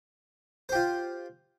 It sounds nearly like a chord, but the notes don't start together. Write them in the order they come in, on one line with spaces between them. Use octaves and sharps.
C5 G4 F4